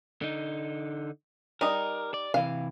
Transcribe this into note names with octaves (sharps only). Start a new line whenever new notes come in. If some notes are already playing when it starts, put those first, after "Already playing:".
D3 D#4
G3 D#4 A#4 D#5
D5
C3 E3 F5